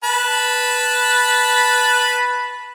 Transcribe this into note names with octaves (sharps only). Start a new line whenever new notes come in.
B4 A5 B5